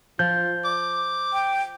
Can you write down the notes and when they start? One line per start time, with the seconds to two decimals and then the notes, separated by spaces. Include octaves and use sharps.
0.19 F3 F4 G6
0.65 D6
1.33 G5